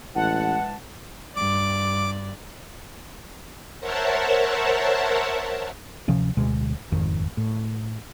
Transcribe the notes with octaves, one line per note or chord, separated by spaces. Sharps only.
A1 E3 G#3 F#5 A5
G2 D5 D6
A#4 C5 C#5 E5 F#5 A5
D1 C3 F3 C#4
D1 D2 B2 G#3
D#1 G#1 F2 D#3
A2